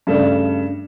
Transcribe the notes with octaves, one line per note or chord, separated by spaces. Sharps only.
G2 C#3 G3 A3